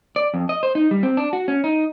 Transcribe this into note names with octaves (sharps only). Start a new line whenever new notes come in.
D5
F2
D#5
C5
D#4
G3
C4
D4
F#4
C#4
D#4